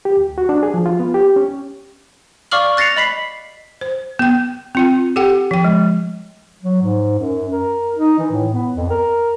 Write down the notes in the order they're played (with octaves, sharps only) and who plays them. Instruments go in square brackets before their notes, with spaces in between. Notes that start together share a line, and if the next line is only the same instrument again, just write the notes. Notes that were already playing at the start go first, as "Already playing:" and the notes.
[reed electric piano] G4
D2
F#4
D4
G#4
F3
F4
B3
G4
C#4
[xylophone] D5 F5 C#6 D6 F6 F#7
F#6 A6 A#6 C7 C#7 F7
D#5 B5 B6 C7
[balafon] C5
B3 G5
C4 F4 G5
G4 A4 F#5 G5
F3 G5
G#3
[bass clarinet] F#3
G#2
F#2
A#4
D#4
E3
A2
B3
F2
A#4